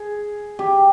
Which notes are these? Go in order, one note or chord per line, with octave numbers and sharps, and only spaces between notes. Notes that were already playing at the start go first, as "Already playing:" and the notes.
Already playing: G#4
G4